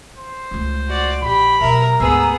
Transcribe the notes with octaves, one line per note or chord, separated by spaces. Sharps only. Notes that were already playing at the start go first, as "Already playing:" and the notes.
C5
C#2 A3
F#4 D5
A#1 G4 B5
B2 F#3 A#4 E5 A#5
D2 G#2 B3 G#4 E6